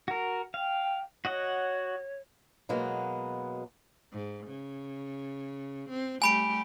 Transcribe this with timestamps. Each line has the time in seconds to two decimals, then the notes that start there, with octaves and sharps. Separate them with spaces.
0.08 F#4 A#4
0.54 F5 G5
1.25 F#4 C#5 D#5 F#5
2.69 B2 F#3 G#3 A#3 B3
4.13 G#2
4.46 C#3
5.89 C4
6.22 G3 A3 G4 G#5 B5 D7